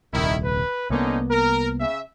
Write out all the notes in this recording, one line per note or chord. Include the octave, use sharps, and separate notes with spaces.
D#1 C2 D#3 E4
B4
C2 D3 A#3 B3 C#4 D#4
A#4
C#3 E5